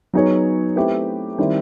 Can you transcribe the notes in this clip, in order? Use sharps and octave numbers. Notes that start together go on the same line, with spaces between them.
F#3 B3 D#4 G#4 C#5
A3 C4 E4 G4 B4
D#3 G3 C4 E4 G4